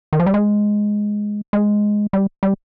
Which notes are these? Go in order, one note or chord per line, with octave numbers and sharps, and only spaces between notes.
D#3
F3
G3
G#3
G#3
G3
G3